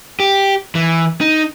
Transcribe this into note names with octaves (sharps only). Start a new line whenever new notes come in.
G4
E3
D#4